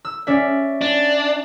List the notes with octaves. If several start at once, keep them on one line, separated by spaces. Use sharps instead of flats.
E6
C#4 D5 E5
D4